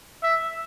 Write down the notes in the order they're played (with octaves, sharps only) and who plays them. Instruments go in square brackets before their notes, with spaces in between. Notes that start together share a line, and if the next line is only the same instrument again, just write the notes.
[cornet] E5